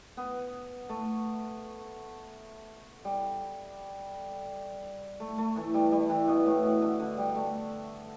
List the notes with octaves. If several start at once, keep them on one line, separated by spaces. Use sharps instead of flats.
B3
A3
G3
A3
A3
E3
G3
G3
E3
B2
A2
B2
D3
D3
G3
A3